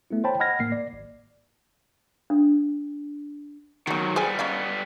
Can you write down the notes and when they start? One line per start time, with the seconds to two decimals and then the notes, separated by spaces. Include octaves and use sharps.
0.10 A3 B3 E4
0.24 C5 C#5 G5 A5 B5
0.40 D#5 F#5 B5 F6 G#6 A#6
0.60 A2 A#3 C7
0.72 D5
0.93 G#1
2.30 D4
3.87 D#3 F#3 B3 F#4
4.16 G3 B3 G#4 C5 G#5
4.39 C#4 D#4 F5